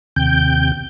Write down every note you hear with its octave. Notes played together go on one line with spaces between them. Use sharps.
D#2 C3 G5 G6